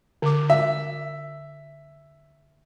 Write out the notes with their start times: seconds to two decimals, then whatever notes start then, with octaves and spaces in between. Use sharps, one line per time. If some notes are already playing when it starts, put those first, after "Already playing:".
0.22 D3 D6
0.50 E5